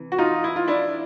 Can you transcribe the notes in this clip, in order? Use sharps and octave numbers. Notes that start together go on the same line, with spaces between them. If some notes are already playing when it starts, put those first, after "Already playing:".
Already playing: C3 E3
F#4
D#4 F4
E4
F4
D4 E4